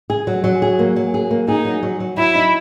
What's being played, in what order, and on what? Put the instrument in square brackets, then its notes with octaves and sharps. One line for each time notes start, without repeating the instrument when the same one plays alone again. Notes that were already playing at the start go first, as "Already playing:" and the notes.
[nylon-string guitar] G#4
F#3
F#3
G#4
A#3
F#3
G#4
A#3
[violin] D#4 [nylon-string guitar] G#4
[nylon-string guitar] F#3
F#3
F#3
[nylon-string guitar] F#3 [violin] E4
[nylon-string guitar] D#4